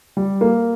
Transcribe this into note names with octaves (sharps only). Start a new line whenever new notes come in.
G3
A#3